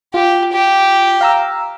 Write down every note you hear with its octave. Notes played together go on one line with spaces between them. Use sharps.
F4 G4
G4
F5 A#5 E6